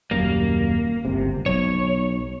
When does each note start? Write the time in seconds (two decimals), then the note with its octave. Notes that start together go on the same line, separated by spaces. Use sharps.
0.11 D#1 F#2 G3 A#3
1.05 G1 C#2 C3
1.46 B1 C#5